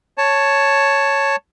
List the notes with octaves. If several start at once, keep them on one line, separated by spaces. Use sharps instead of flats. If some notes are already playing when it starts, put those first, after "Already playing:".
C#5 A5